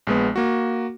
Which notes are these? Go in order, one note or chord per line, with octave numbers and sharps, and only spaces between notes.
A#1 G#3 B3
A#3 F#4